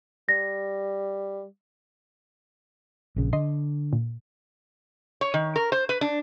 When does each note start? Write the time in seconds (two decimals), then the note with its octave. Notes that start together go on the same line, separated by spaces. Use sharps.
0.29 G3 A#6
3.16 A#1 C#3
3.33 D3 D#5 C6
3.93 A#2
5.21 C#5
5.34 D#3
5.56 A#4
5.72 C5
5.89 B4
6.01 D4